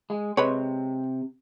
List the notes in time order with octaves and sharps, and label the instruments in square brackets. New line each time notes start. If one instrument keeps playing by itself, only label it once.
[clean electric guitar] G#3
[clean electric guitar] C3 [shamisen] G#3 B4 C#5